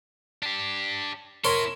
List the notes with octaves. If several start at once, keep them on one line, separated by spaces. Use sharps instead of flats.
D4 G4
E4 A4 A#4 C#5 C6